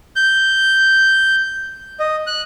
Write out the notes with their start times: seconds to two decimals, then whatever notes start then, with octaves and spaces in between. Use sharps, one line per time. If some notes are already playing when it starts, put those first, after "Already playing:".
0.16 G6
2.00 D#5
2.27 F#6